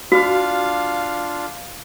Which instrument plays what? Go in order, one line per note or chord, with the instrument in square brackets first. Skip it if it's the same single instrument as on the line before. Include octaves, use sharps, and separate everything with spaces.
[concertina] D4 F4 [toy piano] F#4 [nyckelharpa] F5